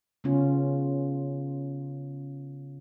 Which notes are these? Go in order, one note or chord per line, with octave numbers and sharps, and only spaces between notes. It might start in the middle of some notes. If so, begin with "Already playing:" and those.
C#3 B3 C#4 F4